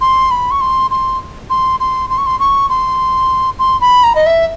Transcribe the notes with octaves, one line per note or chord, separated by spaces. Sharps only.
C6
B5
C#6
C6
C6
C6
C6
C6
C#6
C6
C#6
C6
C6
B5
A#5
D#5
E5